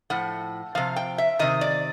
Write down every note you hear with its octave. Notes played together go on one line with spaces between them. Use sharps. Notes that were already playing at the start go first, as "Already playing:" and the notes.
A2 F3 F#5
C3 F3 F5
G5
E5
C3 D#3 D#5
D5